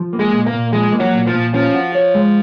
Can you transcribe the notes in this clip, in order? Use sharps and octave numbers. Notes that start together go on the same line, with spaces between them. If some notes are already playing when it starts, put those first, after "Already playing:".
Already playing: F3
A#3
G#3
A#2
A#3
A#2
F3 G#3
A#3
F#3
A#2
F3
A#2
F3 C#4
F#4
C#5
G#3